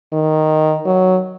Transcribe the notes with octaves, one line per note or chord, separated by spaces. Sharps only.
D#3
F#3